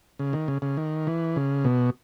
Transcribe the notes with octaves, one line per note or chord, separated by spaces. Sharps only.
C#3
D#3
C#3
C#3
D#3
E3
C#3
B2